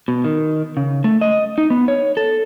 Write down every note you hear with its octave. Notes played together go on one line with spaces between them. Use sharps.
B2
D#3
C#3
A3
D#5
D#4
B3
C#5
A4